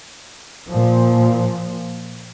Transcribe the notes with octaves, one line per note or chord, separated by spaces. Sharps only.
A#2 F3